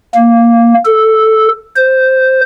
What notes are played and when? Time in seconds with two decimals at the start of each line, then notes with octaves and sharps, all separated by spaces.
0.15 A#3
0.86 A4
1.76 C5